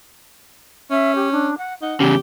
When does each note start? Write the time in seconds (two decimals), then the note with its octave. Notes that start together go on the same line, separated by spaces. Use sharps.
0.90 C#4 E5
1.15 G4
1.31 D4
1.57 F#5
1.82 D#4 F#5
2.00 E2 C#3 G4